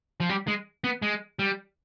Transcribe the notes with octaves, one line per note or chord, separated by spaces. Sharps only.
F3
G3
G#3
B3
G#3
G3